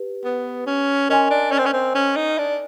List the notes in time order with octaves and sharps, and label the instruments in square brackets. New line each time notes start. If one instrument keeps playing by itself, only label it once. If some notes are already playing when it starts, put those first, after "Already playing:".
Already playing: [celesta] G4 B4
[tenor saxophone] B3
C#4
[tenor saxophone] C#4 [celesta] A#4 D#5 G#5 C6
[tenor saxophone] D4
C#4
C4
C#4
C4
C#4
D#4
D4